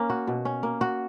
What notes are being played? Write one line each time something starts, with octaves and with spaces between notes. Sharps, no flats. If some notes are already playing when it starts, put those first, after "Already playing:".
Already playing: A#3 C#4
F#4
B2
C#4
A#3
F#4